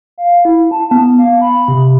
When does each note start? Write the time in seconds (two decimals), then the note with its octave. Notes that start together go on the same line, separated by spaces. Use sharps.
0.18 F5
0.45 E4
0.71 A5
0.91 B3
1.19 F5
1.41 B5
1.68 C3